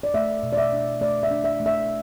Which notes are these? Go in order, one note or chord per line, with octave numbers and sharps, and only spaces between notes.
D5
A3 E5
B2
D5
E5
D4
A3 D5
E5
D4
E5
A3
E5